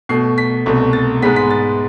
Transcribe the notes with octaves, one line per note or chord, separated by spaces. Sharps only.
B2 A3 C7
B6
C2 B2 A3
A6
G#2 G#3 B3 B6
B6
A6